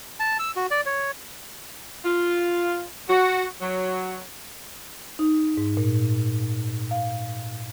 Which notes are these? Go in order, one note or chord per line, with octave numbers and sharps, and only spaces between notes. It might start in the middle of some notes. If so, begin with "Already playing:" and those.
A5
E6
F#4
D5
C#5
F4
F#4
F#3
D#4
G#2
A#2
F5